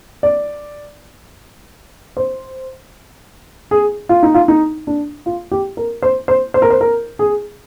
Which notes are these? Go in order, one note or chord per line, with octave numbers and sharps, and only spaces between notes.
D5
C5
G#4
F4
D#4
F4
D#4
D4
F4
G4
A#4
C5
C5
C5
A#4
C5
A#4
G#4